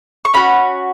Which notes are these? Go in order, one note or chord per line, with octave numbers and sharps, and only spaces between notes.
C#6
C#4 F#4 B5